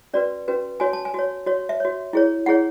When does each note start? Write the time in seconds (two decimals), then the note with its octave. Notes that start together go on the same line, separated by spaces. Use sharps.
0.14 C#4 F#4 B4 D5
0.48 C#4 F#4 B4
0.80 F#4 C#5 G#5
0.93 A5
1.05 G#5
1.14 F#4 C#5
1.46 F#4 C#5
1.69 E5
1.80 F#4 C#5
2.13 E4 G#4 C#5
2.46 E4 G#4 C#5 F#5